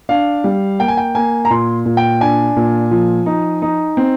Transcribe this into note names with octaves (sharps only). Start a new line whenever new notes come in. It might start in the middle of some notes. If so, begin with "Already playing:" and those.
D4 F5
G3
A#3 G5
G#5
G5
A#3 G#5
A#5
A#2 C6
A#2
G5
D4 G#5
A#2
F3
D#4
D#4
C4